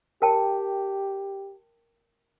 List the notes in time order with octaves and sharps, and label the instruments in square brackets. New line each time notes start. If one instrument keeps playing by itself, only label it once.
[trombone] G4 [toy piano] A#4 G5 A5